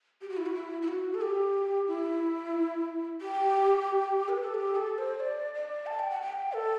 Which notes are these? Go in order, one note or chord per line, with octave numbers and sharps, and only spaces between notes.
G4
F#4
E4
F#4
E4
E4
F#4
A4
G4
E4
G4
B4
A4
G4
A4
C5
D5
D5
A5
G5
F#5
G5
A4